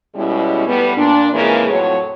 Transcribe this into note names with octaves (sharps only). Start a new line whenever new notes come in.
B2 G3 G#3 C#4 E4
A2 G3 B3
A#2 D4
F2 C#3 E3 G#3 A#3
F2 A2 F#3 C#5